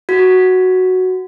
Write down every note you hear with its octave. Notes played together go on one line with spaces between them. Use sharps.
F#4